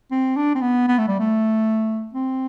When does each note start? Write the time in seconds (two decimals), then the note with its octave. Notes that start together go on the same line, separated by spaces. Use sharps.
0.11 C4
0.36 D4
0.55 C4
0.62 B3
0.87 B3
0.98 A3
1.08 G3
1.19 A3
2.13 C4